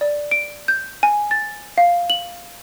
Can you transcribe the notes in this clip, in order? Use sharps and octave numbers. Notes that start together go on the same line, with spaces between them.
D5
D7
G6
G#5
A6
F5
F#7